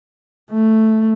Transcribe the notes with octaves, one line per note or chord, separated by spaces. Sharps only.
A3